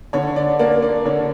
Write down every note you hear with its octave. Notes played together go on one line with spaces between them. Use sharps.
D3 C#5
D5
A#3 D5
D5
D3 C#5